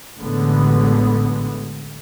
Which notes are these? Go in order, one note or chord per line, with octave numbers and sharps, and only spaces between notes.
A1 A2 D3 G#3 B3